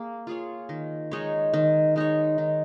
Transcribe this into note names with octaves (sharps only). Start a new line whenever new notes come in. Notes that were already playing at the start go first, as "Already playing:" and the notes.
Already playing: A#3 G#4
F4 G#4 C#5
D#3
G#3 D#4 C#5
D#3
G#3 D#4 C#5
D#3